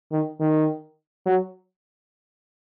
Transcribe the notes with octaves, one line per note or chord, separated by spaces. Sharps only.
D#3
D#3
F#3